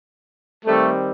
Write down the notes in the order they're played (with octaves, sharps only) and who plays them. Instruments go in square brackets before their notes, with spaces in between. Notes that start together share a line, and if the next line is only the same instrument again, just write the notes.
[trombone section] D#3 G3 C4 [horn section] A3